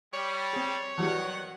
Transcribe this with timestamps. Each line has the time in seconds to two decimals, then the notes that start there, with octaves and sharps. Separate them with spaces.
0.14 G3 C#5
0.53 C4 G#4
0.98 D#3 E3 F#3 G3 F#5